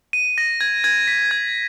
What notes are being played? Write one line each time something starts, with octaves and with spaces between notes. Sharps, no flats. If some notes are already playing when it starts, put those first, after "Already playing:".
D#7
A#6
G#6
G#6
B6
G#6